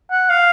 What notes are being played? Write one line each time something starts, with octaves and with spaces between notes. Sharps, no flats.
F#5
F5